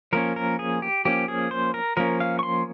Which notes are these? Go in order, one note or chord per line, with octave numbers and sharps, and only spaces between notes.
F3 A#3 C#4 A#4
A#4
G#4
G4
F3 A#3 C#4 G4
G#4
C5
A#4
F3 A#3 C#4 A#4
F5
C#6
C6